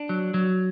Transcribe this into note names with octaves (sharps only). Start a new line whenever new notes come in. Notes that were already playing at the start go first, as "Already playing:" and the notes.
Already playing: D4
F#3
F#3